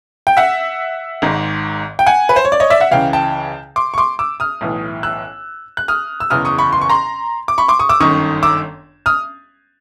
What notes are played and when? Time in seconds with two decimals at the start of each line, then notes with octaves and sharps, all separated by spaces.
0.27 G5
0.37 E5 F#5
1.22 G#1 G#2 D#3
1.99 G5
2.06 F#5 G#5
2.29 B4
2.36 C5
2.45 C#5
2.52 D5
2.60 C#5 D#5
2.70 D5 E5
2.80 E5 F#5
2.91 C#2 C#3 E3 F5 G5
3.13 G5 A5
3.76 C6 D6
3.94 C#6
3.98 C6 D6
4.19 D6 E6
4.40 D#6 F6
4.61 B1 A2 E3
5.03 E6 F#6
5.77 F#6
5.88 D#6 F6
6.20 E6
6.30 F#1 E2 C#3 E3 D#6 F6
6.45 C#6 D#6
6.58 B5 C#6
6.73 C6
6.82 C#6
6.90 A#5 C6
7.48 D6
7.58 B5 C#6
7.68 C6 D6
7.79 C#6 D#6
7.89 D6 E6
8.00 G1 F#2 D#3 C#6 D#6
8.43 D6 E6
9.06 D#6 F6